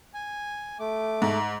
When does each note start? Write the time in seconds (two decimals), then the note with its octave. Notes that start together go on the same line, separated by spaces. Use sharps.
0.14 G#5
0.80 A3 D6
1.22 G#2